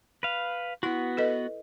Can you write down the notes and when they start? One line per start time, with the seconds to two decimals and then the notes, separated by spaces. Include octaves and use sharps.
0.23 B4 F5
0.83 B3 E4 F#4 F#5
1.17 A4 B4 D#5